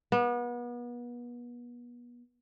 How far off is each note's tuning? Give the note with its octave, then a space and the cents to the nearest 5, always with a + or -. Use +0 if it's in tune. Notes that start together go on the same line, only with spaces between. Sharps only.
B3 -35